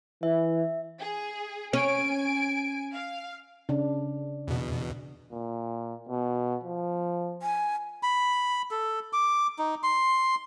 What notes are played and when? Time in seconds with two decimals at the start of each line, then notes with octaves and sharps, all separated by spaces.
0.23 E3 E5
0.98 G#4
1.73 C#4 G#5 D7
2.93 F5
3.69 C#3 D4
4.48 E2 B2
5.33 A#2
6.09 B2
6.64 F3
7.42 G#5
8.03 B5
8.71 A4
9.13 D6
9.59 D#4
9.83 C6